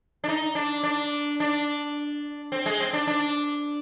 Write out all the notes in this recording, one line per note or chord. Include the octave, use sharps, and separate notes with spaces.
D4
D#4
D4
D4
D4
C4
G#3
C4
D4
D4